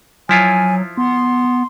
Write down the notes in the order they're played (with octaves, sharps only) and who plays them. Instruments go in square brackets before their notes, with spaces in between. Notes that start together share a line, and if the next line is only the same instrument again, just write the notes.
[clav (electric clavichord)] F3 E4 F4 [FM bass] F#3 [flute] G#5
[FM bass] B3 [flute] C6